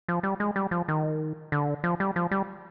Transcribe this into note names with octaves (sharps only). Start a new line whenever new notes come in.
F3
G3
G#3
G3
F3
D#3
D3
F3
G3
F3
G3